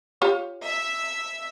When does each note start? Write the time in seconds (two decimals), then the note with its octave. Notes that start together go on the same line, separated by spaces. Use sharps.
0.22 F4 G4 C#5
0.63 E5